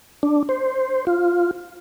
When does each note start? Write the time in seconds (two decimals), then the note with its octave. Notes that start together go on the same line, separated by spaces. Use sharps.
0.23 D4
0.49 C5
1.07 F4